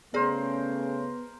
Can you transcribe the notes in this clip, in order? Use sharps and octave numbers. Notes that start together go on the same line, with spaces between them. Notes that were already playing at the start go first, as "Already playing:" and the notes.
C#3 A3 B3 C#4 G#4 A#4 C5 D5